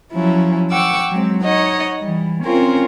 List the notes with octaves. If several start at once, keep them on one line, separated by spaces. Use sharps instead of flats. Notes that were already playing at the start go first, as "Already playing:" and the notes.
F3 F#3 C#4 E4
F#5 G5 C#6 D6 E6
F#3 G#3 C4
D#4 C#5 D#5 F#5
E3 G3
C4 C#4 F4 A#4 C5